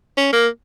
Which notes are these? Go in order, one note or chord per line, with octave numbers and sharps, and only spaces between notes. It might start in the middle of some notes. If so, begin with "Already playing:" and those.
C#4
A#3